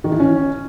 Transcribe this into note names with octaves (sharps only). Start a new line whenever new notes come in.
D#3
E3
C#4